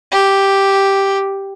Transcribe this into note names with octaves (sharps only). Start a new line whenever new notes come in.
G4